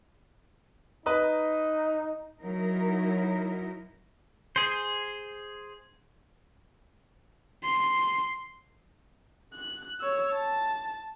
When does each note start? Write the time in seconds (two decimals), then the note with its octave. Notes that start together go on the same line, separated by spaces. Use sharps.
1.06 D#4 B4 D#5
2.41 F#3 D#4 E4 A#4
4.56 G#4 C5
7.64 C6
9.54 F#6
10.00 C#5 E6
10.34 A5